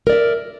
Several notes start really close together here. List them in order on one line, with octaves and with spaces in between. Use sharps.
A#4 D5 E5